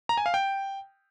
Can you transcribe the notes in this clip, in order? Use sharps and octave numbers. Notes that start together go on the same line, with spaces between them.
A#5
G#5
F5
G5